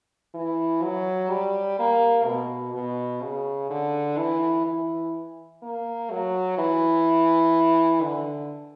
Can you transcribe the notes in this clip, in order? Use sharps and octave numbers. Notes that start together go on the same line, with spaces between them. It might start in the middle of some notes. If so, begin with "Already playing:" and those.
E3
F#3
G3
A#3
B2
B2
C#3
D3
E3
E3
A#3
F#3
E3
D3